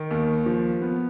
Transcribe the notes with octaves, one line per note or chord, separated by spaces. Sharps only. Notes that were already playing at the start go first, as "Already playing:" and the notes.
Already playing: D#3
D#2
F3
B3